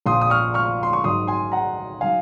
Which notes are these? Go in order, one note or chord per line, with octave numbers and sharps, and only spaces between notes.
A#1 A#2 F3 C6 D#6
D#6
C#6 F6
C#6 F6
C6
C#6
G#1 G#2 D#3 F#3 C6 D#6
G#5 C6
F#5 A#5
D#3 F#3 F5 G#5